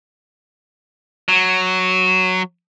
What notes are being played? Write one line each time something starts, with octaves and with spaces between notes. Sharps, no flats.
F#3